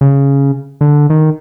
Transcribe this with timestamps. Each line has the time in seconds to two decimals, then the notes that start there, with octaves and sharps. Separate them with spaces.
0.01 C#3
0.81 D3
1.10 D#3